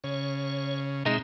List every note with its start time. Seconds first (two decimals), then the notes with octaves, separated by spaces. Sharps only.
0.04 C#3 C#5
1.06 B2 G#3 C4 D#4 E5